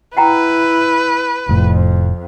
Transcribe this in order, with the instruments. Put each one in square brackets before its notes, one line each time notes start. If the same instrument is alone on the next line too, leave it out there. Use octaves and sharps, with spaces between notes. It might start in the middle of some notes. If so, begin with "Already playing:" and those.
[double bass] E4 [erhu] B4 [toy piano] F#5 G5 A#5
[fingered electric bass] F1 A2 [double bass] F2